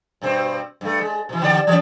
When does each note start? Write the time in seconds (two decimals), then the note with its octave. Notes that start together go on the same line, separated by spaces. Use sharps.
0.22 G2 B2 C4
0.81 G2 A3
1.00 G#3
1.29 B2 E3
1.42 D3 G4 D5
1.67 E3 G3 C#4